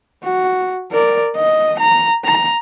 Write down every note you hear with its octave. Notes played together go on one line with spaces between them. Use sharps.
F#4
A#4 D5
D#5
A#5
A#5